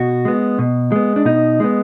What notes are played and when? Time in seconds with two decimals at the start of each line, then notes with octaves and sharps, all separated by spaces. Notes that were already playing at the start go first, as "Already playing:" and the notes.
Already playing: B2 F#4
0.25 G#3 B3
0.59 B2
0.92 G#3 B3
1.16 D4
1.25 B2 D#4
1.60 G#3 B3